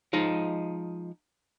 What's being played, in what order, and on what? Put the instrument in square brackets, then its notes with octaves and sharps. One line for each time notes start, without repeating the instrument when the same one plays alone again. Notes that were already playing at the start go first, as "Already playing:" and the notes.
[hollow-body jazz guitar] F3 G#3 D#4